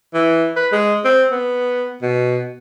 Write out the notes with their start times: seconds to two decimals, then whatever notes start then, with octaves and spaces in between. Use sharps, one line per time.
0.14 E3
0.56 B4
0.72 G#3
1.05 C4
1.31 B3
2.02 B2